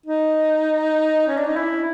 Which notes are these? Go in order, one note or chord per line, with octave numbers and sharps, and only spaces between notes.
D#4
C#4
D4
D#4
E4